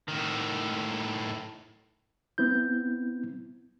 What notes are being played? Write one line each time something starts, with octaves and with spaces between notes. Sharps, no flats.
A2 D#3
B3 C4 E4 G6